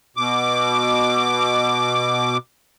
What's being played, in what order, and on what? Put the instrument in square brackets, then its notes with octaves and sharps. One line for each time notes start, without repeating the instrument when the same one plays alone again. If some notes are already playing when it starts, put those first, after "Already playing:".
[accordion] B2 D6